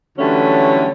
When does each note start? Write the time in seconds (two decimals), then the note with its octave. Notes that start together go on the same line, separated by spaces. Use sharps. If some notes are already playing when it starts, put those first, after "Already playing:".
0.18 D3 E3 F#3 G3 A3 C#4